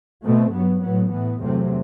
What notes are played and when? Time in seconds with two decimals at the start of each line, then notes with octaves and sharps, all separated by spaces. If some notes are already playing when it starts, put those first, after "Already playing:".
0.24 B2 A3 C4
0.53 G2 F#3 B3
0.82 A2 F#3 B3
1.12 A2 E3 B3
1.41 E2 C3 F#3 A3 C4